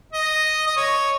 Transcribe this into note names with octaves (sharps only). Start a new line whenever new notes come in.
D#5
D#5
C#5